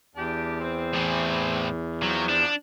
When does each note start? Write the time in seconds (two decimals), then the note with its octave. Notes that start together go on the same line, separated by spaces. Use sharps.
0.15 E2 D4 G4
0.60 C4
0.94 A2 E3
2.03 C3 F3 F#3
2.29 D4